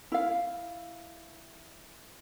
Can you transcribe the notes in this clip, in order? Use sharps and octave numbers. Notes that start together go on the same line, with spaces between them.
E4 F5